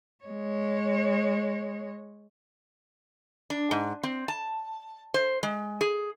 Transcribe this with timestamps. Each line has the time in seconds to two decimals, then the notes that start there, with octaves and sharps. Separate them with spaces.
0.24 G#3 C#5
3.50 D4
3.71 G#2
4.03 C4
4.28 A5
5.14 C5
5.43 G#3
5.81 G#4